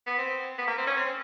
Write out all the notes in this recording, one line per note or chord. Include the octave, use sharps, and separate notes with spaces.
B3
C4
B3
A#3
C4
C#4
C4